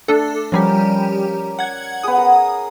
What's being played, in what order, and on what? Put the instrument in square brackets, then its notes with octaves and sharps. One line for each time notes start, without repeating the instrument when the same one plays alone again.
[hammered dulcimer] A3 [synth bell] D4 A4
[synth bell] F3 G3 G4 [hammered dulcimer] C#4 A#4 D5
[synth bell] F#5 G#6
[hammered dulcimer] B3 G#4 [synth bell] D#6
[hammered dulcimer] A#4 F#5